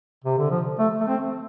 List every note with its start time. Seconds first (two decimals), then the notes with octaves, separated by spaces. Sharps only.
0.24 C3
0.38 D3
0.51 F3
0.79 A3
1.01 A3
1.08 C4